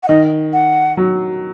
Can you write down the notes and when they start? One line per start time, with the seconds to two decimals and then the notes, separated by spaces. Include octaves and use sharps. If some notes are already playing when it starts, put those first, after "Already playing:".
0.03 F#5
0.08 D#3 D#5
0.53 F#5
0.97 F#3